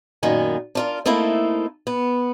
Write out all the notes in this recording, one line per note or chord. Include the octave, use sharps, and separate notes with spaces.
F#2 A#2 D#3 B3 G#5
D4 F4 A#4
A3 A#3 C4 D#4 E4 A4
B3